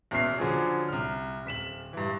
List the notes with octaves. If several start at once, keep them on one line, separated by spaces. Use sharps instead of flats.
E2 B2 C#4 E5 F6 C7
D3 F3 F#3 D4 G#4
C2 F6
D1 B6 E7 F#7
G2 E3